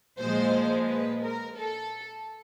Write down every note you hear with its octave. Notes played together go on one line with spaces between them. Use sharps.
A#2 F3 G#3 C5
B4
A#4
A4